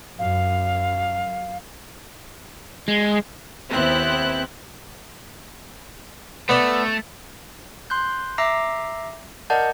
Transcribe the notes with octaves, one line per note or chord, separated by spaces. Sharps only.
F#2 F5
G#3
D#2 B3 C4 E4 F#6
A3 B3 D5
C6 F#6 G6
E5 A#5 D6 E6 A#6 C7
A#4 D5 D#5 F#5 A5 G6